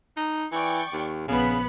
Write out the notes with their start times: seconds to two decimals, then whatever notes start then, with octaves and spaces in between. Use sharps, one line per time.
0.17 D#4
0.52 E3 D5 G5 C#6
0.93 D#2
1.28 A#1 C#3 B3 B5